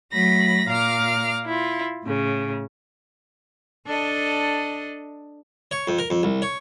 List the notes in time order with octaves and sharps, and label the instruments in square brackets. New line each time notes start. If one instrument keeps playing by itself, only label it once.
[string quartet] F#3 A3 B5 A#6
A#2 F5 A#5 D6 F6
E4 F4
A2 C#3
[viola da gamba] D4 A4 D#5
[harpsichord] C#5
F2
A#4
F2
C2
C#5